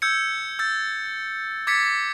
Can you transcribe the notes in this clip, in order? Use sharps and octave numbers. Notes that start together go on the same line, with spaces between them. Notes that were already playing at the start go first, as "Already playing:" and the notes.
E6 G6 G#6 C#7
E6 G6 A6
D6 G#6 A6 B6 C#7